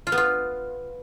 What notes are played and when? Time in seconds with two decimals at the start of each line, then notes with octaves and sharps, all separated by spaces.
0.07 F4
0.12 B3
0.18 F4